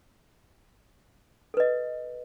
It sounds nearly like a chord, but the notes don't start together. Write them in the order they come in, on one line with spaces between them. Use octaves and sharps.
A4 B4 D#5